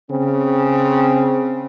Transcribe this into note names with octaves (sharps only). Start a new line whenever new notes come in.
C#3 C4